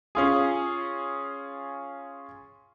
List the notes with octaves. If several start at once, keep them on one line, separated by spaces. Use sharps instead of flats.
C#4 F4 G#4